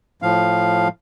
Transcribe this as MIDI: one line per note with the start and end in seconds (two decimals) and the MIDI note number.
0.22 0.88 45
0.22 0.88 53
0.22 0.88 77